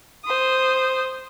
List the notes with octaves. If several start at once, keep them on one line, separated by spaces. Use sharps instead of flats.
C5 D#6